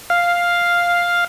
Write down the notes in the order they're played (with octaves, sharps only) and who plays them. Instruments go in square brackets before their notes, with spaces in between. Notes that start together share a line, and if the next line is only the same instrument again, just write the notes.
[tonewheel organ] F5